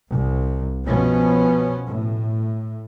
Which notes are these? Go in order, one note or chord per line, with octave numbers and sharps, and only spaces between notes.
C2
B2 F3 B3 C#4
A2